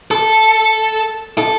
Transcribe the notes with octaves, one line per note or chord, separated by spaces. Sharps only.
A4
A4